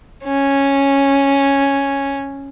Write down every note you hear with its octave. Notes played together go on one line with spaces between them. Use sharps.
C#4